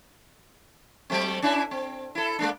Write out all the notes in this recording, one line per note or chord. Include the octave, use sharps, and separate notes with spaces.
F#3 A3 C4
C#4 D4 E4
C4
E4 A4
G#3 A#3 D4